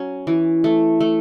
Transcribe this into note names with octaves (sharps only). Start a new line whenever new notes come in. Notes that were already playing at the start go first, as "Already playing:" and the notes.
Already playing: F#3 C#4
E3
A3
A3